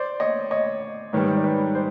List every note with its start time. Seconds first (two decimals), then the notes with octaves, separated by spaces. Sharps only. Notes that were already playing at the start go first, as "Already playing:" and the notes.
Already playing: C5 D5
0.20 C#5 D#5
0.51 C#5 D#5
1.13 G#2 D#3 G3 B4 C#5
1.36 D5
1.44 B4 C#5
1.75 C5 D5